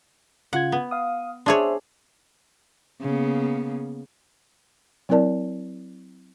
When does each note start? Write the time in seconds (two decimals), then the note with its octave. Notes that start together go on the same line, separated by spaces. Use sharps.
0.53 C#3 F4 F#5 G#6
0.72 B3
0.91 F5 D#6
1.46 D4 G#4 C5 C#5 E5 C6
3.01 C#3 A#3 B3
5.09 F#3 C4 E4 A#4 D5 A5